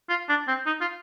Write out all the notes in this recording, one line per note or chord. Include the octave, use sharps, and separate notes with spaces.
F4
D4
C4
D#4
F4